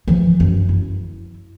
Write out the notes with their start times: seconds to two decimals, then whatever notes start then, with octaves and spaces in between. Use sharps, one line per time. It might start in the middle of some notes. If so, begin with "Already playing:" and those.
0.08 E3 F3
0.40 F#2
0.69 E4